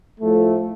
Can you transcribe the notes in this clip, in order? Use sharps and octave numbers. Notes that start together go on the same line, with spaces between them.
A2 F3 A3